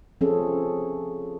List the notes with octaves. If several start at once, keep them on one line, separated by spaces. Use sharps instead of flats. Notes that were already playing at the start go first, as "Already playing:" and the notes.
F3 C4 C#4 G#4 A4